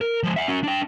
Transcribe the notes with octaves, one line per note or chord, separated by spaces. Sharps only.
A#4
F3 G#3
E5 F#5
C#4 F#4
D4 G5